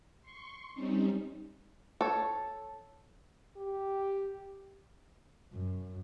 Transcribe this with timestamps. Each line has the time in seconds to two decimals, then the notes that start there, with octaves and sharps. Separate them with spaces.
0.21 C6 C#6
0.74 G3 C4 C#4 D#4
2.01 A4 C#5
3.57 G4
5.53 F#2